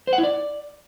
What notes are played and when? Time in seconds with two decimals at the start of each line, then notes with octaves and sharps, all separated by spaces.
0.07 C5
0.13 F#5
0.18 E4
0.23 D5